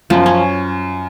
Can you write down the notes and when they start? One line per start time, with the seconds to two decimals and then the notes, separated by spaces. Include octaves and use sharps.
0.10 F#2 F3
0.26 C#4